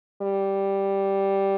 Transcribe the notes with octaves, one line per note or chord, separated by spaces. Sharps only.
G3